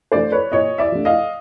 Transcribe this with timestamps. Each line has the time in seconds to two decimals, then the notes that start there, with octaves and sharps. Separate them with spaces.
0.12 F3 A3 D4 C5 D5
0.32 B4 C#5
0.52 A#2 C#5 D#5
0.78 D5 E5
0.92 F3 A3 D4
1.05 D#5 F5